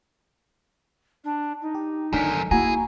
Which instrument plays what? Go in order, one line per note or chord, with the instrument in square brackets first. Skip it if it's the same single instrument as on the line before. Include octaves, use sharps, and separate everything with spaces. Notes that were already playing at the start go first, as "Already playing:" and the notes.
[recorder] D4
D#4
[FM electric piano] G4
[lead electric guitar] F#2 D#3 [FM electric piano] D3 B6 [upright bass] F#3
[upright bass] A#3 [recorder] E4 [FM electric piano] F#4 G#5 A#5 [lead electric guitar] G#4